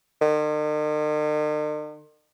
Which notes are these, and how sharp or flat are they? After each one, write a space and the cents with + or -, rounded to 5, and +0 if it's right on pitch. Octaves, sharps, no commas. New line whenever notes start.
D#3 -45